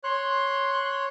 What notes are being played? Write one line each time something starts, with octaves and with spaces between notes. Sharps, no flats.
C#5 C6 F#6